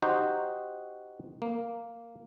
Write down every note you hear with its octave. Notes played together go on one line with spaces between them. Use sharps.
D#4 F#4 G4 C5
A#3